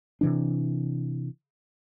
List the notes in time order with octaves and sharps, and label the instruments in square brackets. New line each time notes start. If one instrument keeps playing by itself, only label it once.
[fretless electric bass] C3 E3 D4